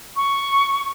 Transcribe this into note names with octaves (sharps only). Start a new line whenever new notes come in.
C#6